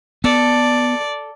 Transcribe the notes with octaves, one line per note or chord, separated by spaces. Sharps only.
B3 A4 D5